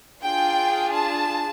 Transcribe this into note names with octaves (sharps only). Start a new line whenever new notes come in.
D4 F4 G#4 G5
A5